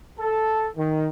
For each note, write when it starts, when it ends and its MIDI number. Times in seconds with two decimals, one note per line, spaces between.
0.19 0.68 69
0.76 1.08 51